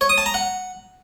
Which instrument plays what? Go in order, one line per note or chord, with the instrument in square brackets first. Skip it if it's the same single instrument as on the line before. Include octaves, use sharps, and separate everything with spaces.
[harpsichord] C#5
D#6
A5
A#5
F#5